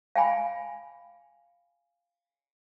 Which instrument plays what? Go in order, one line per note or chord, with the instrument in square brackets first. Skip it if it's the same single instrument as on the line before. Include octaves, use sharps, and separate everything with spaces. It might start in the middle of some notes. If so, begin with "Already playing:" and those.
[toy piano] F5 G5 G#5 B5